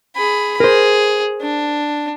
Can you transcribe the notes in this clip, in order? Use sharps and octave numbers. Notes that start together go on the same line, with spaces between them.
G#4 B5
G#4 A#4 C5
D4